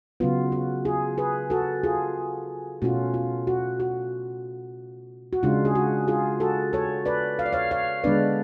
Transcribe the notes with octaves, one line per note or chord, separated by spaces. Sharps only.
C#3 F#3 B3 F4
F#4
F4 G#4
G#4 B4
F#4 A4
F4 G#4
B2 A3 C#4 F4 F#4
F4
F#4
F#4
F#4
C#3 G#3 D4 F4
G#4
F#4
F4 G#4
F#4 A4
A4 C#5
B4 D5
F5
D5
C#5 F5
C#5 F5
D3 G#3 B3 D4 B4 D5